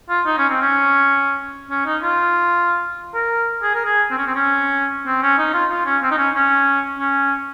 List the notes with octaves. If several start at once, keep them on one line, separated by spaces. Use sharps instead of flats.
F4
D#4
C#4
C4
C#4
C#4
D#4
F4
A#4
G#4
A#4
G#4
C4
C#4
C4
C#4
C4
C#4
D#4
F4
F4
C#4
C4
D#4
C#4
C#4
C#4